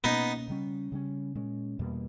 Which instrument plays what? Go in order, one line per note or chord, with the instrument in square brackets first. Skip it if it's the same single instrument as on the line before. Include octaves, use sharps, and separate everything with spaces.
[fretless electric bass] B2 A#3 C#4 [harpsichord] B3 D#4
[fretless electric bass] C#3 G3 C#4
C#3 G3 C#4
A#2 G#3 C#4
E2 B2 G3 A#3